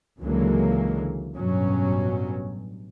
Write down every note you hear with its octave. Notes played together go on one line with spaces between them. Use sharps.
C#2 D3 E3 F#3 G#3 A#3
A1 G2 B2 F#3 C#4